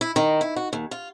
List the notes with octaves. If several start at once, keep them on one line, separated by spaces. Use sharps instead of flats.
E4
D#3
E4
F#4
D#2
F4